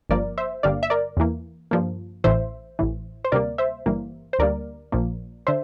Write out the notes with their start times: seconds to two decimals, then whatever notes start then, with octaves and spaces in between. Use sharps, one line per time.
0.10 G1 G2 F3 A#3 A#4 D5
0.38 C5 E5
0.63 G1 G2 D3 G3 A#3 D5 F5
0.83 E5
0.90 A#4 D5
1.17 E2 E3 A#3
1.71 G2 F3 A#3
2.24 A1 A2 E3 C5 E5
2.79 A1 A2 E3
3.25 C5
3.32 D2 C3 G3 A#3 A#4 D5
3.58 C5 E5
3.86 G1 G2 E3 G3 A#3
4.33 C5
4.39 D2 D3 G3 A#3 A#4 D5
4.92 A#1 A#2 F3 A#3
5.47 D3 C5 E5